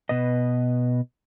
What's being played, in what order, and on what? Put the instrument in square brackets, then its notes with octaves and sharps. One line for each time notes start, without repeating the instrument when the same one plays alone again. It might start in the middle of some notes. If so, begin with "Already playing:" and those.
[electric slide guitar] B2 B4 D#5